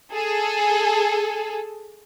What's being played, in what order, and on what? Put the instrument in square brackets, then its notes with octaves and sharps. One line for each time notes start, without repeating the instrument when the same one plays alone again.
[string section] G#4 A4